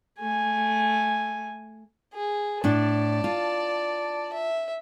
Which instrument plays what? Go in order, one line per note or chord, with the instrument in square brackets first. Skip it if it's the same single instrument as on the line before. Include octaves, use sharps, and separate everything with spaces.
[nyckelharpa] A3 G#5
[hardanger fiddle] G#4
[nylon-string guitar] A2 D4 [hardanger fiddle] D5 A5
[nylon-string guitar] F4
[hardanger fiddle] E5